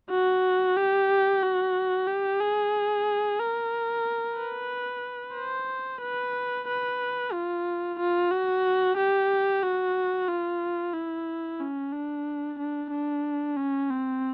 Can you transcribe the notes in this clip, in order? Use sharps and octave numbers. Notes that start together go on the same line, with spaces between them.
F#4
G4
F#4
G4
G#4
A#4
B4
C5
B4
B4
F4
F4
F#4
G4
F#4
F4
E4
C#4
D4
D4
D4
C#4
C4